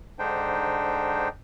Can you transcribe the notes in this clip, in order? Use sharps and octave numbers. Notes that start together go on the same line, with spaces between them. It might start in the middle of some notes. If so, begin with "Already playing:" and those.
G#2 D3 D4 D#4 C5 G5